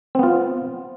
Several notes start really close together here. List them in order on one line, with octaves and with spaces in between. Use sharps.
C4 B3 F4